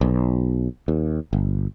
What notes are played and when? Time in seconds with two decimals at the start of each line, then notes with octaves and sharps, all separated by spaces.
0.01 B1
0.88 D#2
1.33 G1